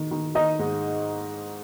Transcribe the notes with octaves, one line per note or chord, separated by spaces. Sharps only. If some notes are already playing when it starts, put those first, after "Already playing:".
Already playing: D#3
D#3
D#3 D#4 D#5
G#2